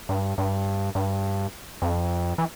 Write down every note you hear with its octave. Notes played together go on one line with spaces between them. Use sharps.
G2
G2
G2
F2
E3